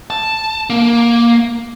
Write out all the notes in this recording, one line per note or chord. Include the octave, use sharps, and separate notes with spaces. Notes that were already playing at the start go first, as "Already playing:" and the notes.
A5
A#3